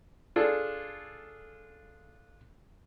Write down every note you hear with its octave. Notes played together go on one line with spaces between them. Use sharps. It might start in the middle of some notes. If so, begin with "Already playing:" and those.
D4 F4 G#4 A4